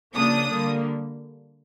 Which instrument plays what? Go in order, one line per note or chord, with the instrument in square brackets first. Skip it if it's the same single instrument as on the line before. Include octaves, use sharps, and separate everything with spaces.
[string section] C#3 F3 A#3 D4 D#6
D3 G3 A#3